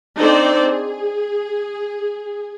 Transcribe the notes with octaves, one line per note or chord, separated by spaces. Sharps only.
C4 D4 D#4 A4 C5 D5
G#4